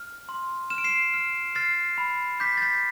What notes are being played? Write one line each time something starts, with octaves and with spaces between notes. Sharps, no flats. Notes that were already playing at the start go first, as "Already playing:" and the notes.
Already playing: F6
C6
F6 E7
D7
C7 E7
F6
F6 A6 C7
B5
D6 G6 B6
A6
G6 B6